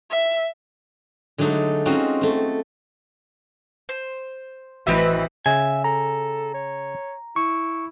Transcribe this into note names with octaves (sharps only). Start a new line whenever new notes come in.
E5
D3 F#3 G#3 A3 D#4
G#3 C4 C#4 D#4 F4 F#4
A3 C4
C5
A1 E3 B3 C4 F#4 B4 D#5 E5
C#3 E5 G#5
A4 A#5
C#5
E4 C#6